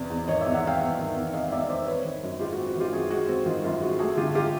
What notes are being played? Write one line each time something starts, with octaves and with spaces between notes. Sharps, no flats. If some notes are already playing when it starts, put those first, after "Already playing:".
Already playing: E2 C3 D5
E2
D#3 C#5 D#5
D5 E5
E2
E5 F#5
C3 F5 G5
E2
D#3
E2
C3 D#5 F5
E2 D5 E5
D#3 C5 D5
C4 B4 C#5
D#3
F#2
G#3 F4 G4
F#4
C4
F#4
D#3 F4 G4
F#2 F#4 G#4
G#3 F#4 G#4
C4 F#4
D#3 F4
F#2 F4
G#3 F#4
A3 F#4 G#4
D3 F4 G4
F4 G4